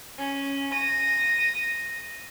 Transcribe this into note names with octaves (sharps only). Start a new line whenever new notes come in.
C#4
A#6 D#7